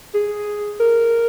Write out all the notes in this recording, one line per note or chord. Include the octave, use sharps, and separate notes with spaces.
G#4
A#4